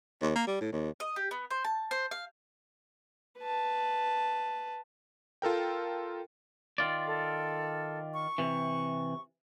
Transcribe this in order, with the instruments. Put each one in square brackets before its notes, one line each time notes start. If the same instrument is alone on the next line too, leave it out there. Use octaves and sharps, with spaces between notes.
[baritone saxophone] D#2
A#3
G3
A2
D#2
[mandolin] D#5
G4
B3
C5
A5
C5
F5
[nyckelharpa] B4 A5
[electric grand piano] F4 A4 A#4 G5
[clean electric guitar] D#3 F4 D5
[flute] A4
C#6
[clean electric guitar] C3 E3